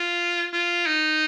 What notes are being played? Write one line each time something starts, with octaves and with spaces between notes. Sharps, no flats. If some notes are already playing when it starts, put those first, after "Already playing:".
Already playing: F4
F4
D#4